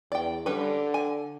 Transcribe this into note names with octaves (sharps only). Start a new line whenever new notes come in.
E2 D5 G5
D3 G3 C#4 B4
G#5